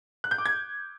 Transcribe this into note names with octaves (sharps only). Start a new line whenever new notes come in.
F#6
G6
D6
G#6